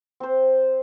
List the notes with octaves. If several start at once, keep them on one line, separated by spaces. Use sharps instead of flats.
C4 C5